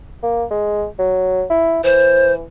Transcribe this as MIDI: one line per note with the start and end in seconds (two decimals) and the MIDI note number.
0.23 0.45 58
0.51 0.87 56
0.99 1.44 54
1.50 1.81 64
1.84 2.46 52
1.84 2.32 72